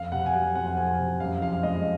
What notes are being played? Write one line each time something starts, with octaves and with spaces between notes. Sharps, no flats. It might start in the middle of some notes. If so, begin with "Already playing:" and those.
Already playing: F2 F5
C3 F#5
G#5
F#3 F#5
F2 F#5
F2 G#5
C3
F#2 F5
F3 F5
F5
G#3 D#5